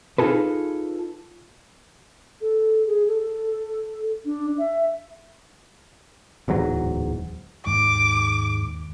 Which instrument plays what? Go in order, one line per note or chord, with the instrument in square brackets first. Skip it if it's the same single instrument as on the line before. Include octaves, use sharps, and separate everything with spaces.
[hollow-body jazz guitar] D#4 F4 G#4 A4 B4
[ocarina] A4
G#4
A4
D4
E5
[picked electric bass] D1 E2 G#2 F#3
[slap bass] D#2 G#3 [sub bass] G#2 [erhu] D6